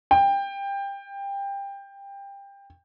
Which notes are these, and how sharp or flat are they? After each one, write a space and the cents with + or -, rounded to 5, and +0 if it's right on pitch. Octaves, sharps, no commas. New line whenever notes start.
G5 +20